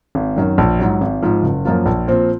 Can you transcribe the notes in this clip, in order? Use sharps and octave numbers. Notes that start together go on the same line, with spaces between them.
G#1
F#2 D#3
A#1
G#2 F#3
G#1
G#2 F3
F#1
F#2 F3 A#3 F4
A#1
A#2 F3 C4